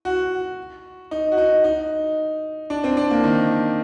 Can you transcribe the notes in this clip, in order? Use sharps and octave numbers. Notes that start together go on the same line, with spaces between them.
F#4
D#4
F#4
D#4
D#4
D4
C4
D4
A#3
D#3